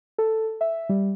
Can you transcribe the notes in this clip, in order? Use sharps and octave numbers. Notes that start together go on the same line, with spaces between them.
A4
E5
G3